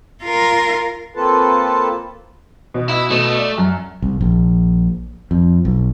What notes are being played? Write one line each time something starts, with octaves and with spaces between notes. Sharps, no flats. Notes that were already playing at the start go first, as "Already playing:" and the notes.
F4 A#4
A#3 C4 F4 A4 B4 A5
B2
E4
B2 A3
D5
F#2
C2
A#1
F2
B1